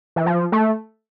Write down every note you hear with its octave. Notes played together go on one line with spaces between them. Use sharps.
E3
F3
A3